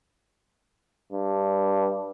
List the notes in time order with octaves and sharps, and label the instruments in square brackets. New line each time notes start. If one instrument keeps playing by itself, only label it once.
[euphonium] G2